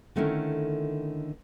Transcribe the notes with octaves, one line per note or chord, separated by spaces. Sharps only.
D3 D#3 A3 C#4 E4 A#4